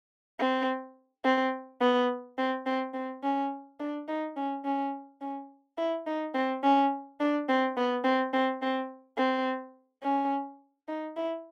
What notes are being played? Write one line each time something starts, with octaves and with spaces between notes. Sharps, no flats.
C4
C4
B3
C4
C4
C4
C#4
D4
D#4
C#4
C#4
C#4
E4
D#4
C4
C#4
D4
C4
B3
C4
C4
C4
C4
C#4
D#4
E4